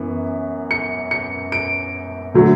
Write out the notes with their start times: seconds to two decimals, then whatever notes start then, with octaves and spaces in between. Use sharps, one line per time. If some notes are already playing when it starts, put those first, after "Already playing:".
Already playing: F#2 E3 B3
0.71 C#7
1.11 C#7
1.52 D7
2.34 D3 F#3 A3